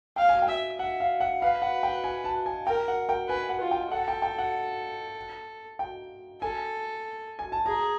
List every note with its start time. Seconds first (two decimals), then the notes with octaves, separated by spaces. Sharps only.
0.16 F5 G5
0.29 G#5
0.42 G5
0.48 E5
0.79 E5 F#5
1.00 F5
1.20 F#5
1.42 B4 F5
1.62 F#5
1.83 G5
2.04 G#5
2.24 A5
2.46 G#5
2.66 A#4 G5
2.88 F#5
3.09 G5
3.29 B4 G#5
3.49 F#5
3.61 F4
3.71 G5
3.91 A4 F#5
4.08 G5
4.22 G5
4.38 F#5
5.79 G5
6.41 A4 G#5
7.39 G#5
7.52 A5
7.66 G#4 A#5